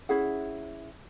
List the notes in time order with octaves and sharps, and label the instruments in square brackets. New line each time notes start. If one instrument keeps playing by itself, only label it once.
[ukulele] C#4 E4 G#4 F#5